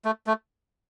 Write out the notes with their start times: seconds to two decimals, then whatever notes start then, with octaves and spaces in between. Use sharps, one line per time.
0.05 A3
0.27 A3